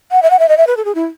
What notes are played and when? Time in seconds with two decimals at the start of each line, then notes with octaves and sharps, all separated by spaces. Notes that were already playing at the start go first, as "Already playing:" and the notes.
0.12 F#5
0.23 E5
0.30 F#5
0.39 E5
0.49 D#5
0.57 E5
0.67 B4
0.77 A4
0.85 G#4
0.95 E4